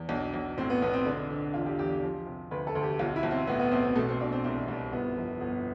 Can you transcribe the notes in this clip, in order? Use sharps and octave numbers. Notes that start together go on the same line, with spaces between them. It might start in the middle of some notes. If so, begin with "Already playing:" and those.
Already playing: E2
B1 D4
B1
A2 C4
B3
B1 B3
C4
D3 D4
D3
E2 F4
G4
E2 G4
F3
C3
D2 B4
A4
D2
G4
B1 F4
E4
B1
C4
A2 B3
B3
B1 C4
C4
B2 A3
C4
B2 D4
C4
C2 C4
C2
G1 B3
F2
G1 B3